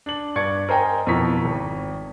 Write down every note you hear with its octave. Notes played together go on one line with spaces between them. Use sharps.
D4 F#7
G2 D5 C#6 G#6 C#7
A#4 C5 D#5 G5 G#5
F2 B2 E4 A#5 C#6 B6
G#1